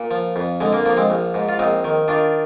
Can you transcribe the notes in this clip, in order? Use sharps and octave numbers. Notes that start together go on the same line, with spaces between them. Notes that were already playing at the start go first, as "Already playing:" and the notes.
Already playing: A#2
F3
F2
D3 G#3
A#3
F3 A#3
G#3 C4
A#1
G#2
F4
A#1 C4 D#4
D#3
D#3 D4 F4